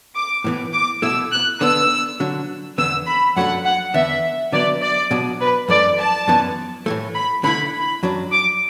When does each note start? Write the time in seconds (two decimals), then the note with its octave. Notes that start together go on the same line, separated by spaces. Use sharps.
0.16 D6
0.44 A2 E3 B3
0.73 D6
1.02 B2 A3 E4 E6
1.32 F#6
1.61 D3 B3 D4 E6
2.20 D3 F#3 D4
2.78 E2 D3 B3 E6
3.07 B5
3.36 F#2 F#3 A3 D4 F#5
3.65 F#5
3.94 E2 D3 B3 D4 E5
4.52 D3 F#3 B3 D5
4.82 D5
5.11 B2 F#3 D4
5.40 B4
5.68 F#2 E3 A3 D5
5.98 A5
6.28 F#2 E3 B3 E4
6.86 A2 E3 A3
7.14 B5
7.44 D3 A3 E4 B5
7.73 B5
8.03 F#2 F#3 D4
8.32 D6